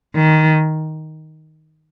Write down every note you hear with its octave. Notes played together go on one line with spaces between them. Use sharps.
D#3